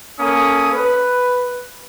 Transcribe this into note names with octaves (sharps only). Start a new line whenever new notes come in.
A#3 C#4 A4 D#6
B4